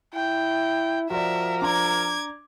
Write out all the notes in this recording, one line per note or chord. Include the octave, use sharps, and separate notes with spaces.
E4 G5
F3 F#4 A#4 D5 E5
D4 A#5 D6 G#6